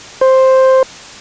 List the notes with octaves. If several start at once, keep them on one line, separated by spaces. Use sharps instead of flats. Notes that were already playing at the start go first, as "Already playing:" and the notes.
C5